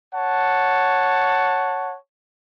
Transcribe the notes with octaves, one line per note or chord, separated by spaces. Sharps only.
C#5 F#5 A5